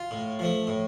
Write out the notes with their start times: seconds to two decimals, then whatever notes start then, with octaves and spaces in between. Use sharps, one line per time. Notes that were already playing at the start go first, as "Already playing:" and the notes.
Already playing: F4
0.11 A2
0.39 F3 A3
0.67 A2